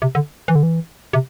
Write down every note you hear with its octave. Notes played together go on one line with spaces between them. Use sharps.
C3
D3
E3
D3
E3
C3